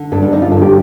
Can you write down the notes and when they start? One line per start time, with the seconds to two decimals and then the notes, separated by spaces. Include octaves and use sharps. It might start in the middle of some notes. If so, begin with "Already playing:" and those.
Already playing: D3
0.12 G2 A4
0.22 D4
0.32 D3 D#4
0.42 F4
0.52 G2 A4
0.62 G4